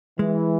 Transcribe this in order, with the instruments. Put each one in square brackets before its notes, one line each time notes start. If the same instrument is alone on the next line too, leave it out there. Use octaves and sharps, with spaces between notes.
[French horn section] E3 [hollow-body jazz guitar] G#3